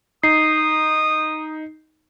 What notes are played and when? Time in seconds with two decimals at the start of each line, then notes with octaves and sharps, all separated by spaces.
0.23 D#4 D#6 C7